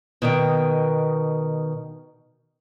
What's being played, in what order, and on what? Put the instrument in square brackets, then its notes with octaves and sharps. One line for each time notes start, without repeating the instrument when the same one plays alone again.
[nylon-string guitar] B2 D#3 G5